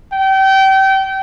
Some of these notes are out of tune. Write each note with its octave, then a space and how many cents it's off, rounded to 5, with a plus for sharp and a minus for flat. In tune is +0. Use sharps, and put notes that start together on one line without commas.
G5 -30